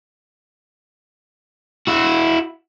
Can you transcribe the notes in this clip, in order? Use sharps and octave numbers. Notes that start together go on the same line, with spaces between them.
E4 F#4